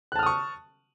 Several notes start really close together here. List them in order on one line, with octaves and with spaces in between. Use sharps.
F#6 A5 F6 D#6 C#6